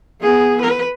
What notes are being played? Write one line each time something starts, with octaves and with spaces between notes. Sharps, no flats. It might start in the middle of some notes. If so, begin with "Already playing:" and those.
B3 G#4
B4